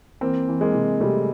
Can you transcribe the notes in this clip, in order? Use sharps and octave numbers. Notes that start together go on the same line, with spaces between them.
E3 A#3 C4
E3
G#3 A#3
C3
C3 G3 A3